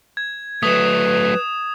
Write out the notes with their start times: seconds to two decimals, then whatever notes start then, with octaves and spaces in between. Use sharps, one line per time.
0.17 G#6
0.63 F#3 A3 B4 D#6 E7